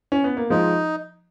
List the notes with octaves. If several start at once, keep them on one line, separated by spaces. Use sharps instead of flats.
C#4
B3
A#3
F3 G#3 D#4